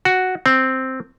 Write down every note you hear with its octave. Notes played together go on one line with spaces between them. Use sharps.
F#4
C4